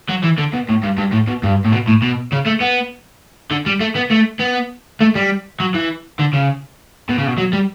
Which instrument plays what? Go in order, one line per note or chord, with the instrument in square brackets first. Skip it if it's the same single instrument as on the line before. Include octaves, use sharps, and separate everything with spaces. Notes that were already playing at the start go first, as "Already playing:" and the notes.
[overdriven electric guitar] F#3
E3
D3
B2
A2
G2
G2
A2
B2
G2
A2
B2
A2
B2
C#3
A3
B3
D3
G3
A3
B3
A3
B3
A3
G3
F#3
E3
D3
C#3
B2
C#3
B2
F#3
G3